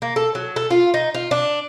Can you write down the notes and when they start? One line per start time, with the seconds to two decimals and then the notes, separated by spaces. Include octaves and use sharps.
0.02 A#3
0.16 A4
0.35 F#3
0.56 A4
0.71 F4
0.94 D#4
1.14 F4
1.31 D4